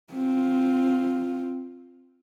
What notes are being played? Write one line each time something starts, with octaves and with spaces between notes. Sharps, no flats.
C4 F4